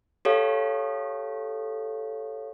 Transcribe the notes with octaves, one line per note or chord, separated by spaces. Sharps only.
G4 A4 C#5 F5